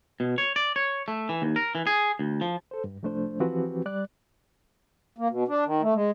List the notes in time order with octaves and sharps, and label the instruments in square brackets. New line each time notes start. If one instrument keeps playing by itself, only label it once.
[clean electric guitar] B2
C#5
D5
C#5
A3
E3
D#2
A#4
E3
G#4
D2
F3
[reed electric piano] A4 C5
G2
C2 F3 A3 D4 C5
E3 F3 C4 F#4 G4 B4
G3 D5 F#6
[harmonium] A#3
B2
D4
D#3
A3
G#3